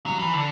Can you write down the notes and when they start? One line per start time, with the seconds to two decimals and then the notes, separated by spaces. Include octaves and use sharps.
0.06 F#3
0.19 E3
0.33 D3